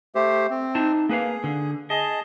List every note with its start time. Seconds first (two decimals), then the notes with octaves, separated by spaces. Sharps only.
0.15 A3 G4 C5
0.50 C4
0.75 D#4 A5
1.09 A#3 G#4 B4 F5
1.44 D3
1.90 G#4 D#5 A5